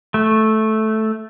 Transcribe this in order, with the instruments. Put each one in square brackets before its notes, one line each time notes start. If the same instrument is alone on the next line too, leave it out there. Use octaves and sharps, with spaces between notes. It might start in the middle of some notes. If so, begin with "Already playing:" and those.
[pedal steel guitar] A3